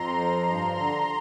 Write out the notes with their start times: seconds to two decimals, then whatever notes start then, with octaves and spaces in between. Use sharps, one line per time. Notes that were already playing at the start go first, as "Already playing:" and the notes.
Already playing: F2 A#5 C6
0.18 F3
0.48 G2
0.78 D3